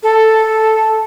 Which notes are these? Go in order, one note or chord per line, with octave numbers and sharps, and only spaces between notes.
A4